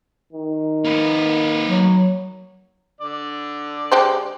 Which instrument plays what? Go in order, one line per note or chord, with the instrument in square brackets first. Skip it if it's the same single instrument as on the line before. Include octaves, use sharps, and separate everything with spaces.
[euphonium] D#3
[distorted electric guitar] A#3 B4
[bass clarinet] F#3
[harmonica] D3 D5
[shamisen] G#3 G4 C5